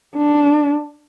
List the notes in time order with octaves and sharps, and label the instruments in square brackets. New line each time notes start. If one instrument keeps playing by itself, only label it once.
[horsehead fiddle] D4